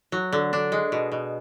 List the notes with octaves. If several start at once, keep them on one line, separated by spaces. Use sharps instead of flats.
F#3
D3
D4
G#3
B2
B2